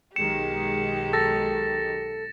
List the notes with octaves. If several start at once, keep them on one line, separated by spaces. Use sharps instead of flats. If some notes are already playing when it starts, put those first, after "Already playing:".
B1 D#3 G#3 G4 C#7 E7
A4 A6 A#6